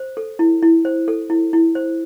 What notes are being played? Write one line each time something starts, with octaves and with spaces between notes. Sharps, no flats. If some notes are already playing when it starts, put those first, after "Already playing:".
Already playing: C5
A4
E4
E4
C5
A4
E4
E4
C5